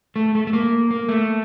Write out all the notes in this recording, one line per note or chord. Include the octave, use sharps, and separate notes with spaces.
A3
A3
A3
A#3
A#3
A3